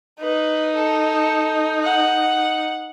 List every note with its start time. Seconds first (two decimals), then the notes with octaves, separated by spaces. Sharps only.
0.21 D#4 B4
0.75 A4
1.83 F#5